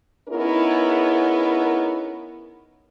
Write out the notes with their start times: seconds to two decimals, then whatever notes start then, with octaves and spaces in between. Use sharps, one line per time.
0.29 B3 C#4 D#4 E4 G#4 A#4